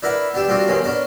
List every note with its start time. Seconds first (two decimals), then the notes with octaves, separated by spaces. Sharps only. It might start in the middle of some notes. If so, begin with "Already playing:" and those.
0.03 D4 E4 A#4 B4 F#5 B5
0.34 B3 D4 G4 E5
0.48 G3 A#3 C4 D4 F4 F#4
0.67 D#2 B2 F#3 G#3 A#3 C#4
0.84 B3 C#4 D4 A#4